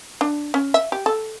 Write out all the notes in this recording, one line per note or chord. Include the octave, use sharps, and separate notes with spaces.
D4
C#4
E5
G4
A4